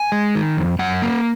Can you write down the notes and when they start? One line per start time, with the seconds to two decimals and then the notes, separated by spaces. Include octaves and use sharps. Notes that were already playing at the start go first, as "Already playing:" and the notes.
Already playing: G#5
0.12 G#3
0.35 D#3
0.57 F2
0.79 F#2 F#5
1.02 A#3